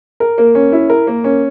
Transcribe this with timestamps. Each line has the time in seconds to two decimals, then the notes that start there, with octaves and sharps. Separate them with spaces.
0.20 A#4
0.38 A#3
0.55 C#4
0.72 E4
0.90 A#4
1.07 A#3
1.24 C#4